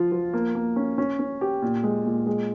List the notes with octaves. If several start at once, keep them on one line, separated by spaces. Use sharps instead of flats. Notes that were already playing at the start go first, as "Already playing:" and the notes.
Already playing: F3 F4
F3
A#3
A#3
C#4
C#4
C#4
G4
A#2
G#3
A#2
G#3